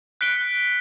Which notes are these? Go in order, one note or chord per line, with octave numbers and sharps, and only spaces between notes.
F#6 B6 C#7 D7 G7